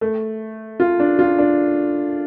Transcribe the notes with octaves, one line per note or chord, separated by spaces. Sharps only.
A3
F4
D4
F4
D4